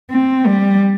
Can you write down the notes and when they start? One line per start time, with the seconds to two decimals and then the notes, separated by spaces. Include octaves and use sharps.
0.11 C4
0.46 G3